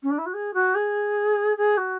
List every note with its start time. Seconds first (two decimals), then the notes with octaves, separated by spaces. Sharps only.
0.03 C#4
0.10 D4
0.18 E4
0.26 F#4
0.33 G#4
0.54 F#4
0.75 G#4
1.57 G#4
1.77 F#4